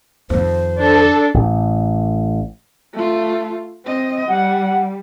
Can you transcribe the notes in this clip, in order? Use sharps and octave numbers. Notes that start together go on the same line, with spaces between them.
F2 D#3 C5
D4 A4
A1
A3 F4
C4 D#5
G3 F#5